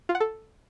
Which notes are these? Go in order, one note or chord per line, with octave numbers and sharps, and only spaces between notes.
F4
F#5
A4